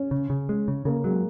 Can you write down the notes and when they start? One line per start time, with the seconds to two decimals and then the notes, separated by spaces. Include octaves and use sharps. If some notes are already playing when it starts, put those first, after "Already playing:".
Already playing: C#4
0.11 C#3
0.30 C#3
0.49 G#3
0.68 C#3
0.85 C#3 A#3
1.04 F#3 G#3